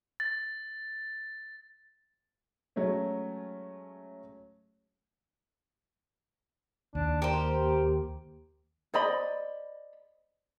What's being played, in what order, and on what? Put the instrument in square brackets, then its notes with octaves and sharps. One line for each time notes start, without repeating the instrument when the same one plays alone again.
[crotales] A6
[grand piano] F#3 G#3 A3 C#4
[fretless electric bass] D#2 [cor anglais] D4
[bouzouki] G4 C5 [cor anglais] A#4
[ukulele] C5 D5 D#5 B5